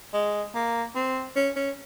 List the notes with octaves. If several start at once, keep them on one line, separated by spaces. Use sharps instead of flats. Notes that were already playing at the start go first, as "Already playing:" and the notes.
G#3
A#3
C4
C#4
C#4